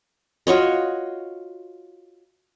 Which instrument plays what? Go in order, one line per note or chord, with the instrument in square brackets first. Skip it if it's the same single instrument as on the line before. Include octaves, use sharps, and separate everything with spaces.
[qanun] F4 F#4 C#5 D#5